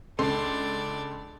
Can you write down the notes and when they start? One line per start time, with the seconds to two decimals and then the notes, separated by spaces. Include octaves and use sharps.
0.19 C#2 D4 A4 D5 C6